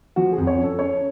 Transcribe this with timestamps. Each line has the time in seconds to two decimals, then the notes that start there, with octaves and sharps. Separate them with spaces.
0.16 F3 F#4
0.32 G#4
0.38 F2
0.47 C#5
0.58 C#4
0.64 A4
0.79 C#4 C#5